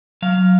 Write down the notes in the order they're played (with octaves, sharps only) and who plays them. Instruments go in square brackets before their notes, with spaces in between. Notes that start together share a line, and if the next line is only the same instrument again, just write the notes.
[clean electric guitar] F#3 F5